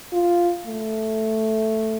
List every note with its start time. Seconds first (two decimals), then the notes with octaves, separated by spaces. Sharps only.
0.13 F4
0.67 A3